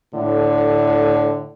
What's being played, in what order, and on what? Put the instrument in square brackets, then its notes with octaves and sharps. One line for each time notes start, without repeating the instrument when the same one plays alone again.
[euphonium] A2 [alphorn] D3